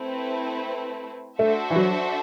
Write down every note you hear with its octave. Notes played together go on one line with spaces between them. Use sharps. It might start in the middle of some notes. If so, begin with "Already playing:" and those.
Already playing: A3 C4 E4 B4
A3 D4 F#4 A4 C5 E5
E3
F#3